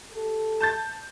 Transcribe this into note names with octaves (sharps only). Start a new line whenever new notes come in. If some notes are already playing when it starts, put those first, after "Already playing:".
G4 A4
A5 G6 A6